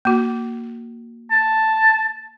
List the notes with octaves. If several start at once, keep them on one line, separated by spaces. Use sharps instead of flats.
A#3 F#4
A5